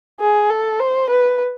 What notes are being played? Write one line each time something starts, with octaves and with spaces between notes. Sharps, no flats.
G#4
A4
C5
B4